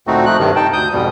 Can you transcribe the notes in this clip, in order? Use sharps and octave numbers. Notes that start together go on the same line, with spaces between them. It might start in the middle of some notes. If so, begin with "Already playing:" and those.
D2 A#2 A3 C4 D#4 F#4
F3 A3 F#6
G2 C3 D#3
D#4 G5 A5
D2 D#6 G6
F2 G#2 B2 G3